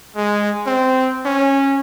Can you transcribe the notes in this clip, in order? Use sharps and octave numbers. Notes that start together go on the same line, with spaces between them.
G#3
C4
C#4